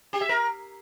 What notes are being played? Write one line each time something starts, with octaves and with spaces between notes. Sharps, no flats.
G4
E5
A#4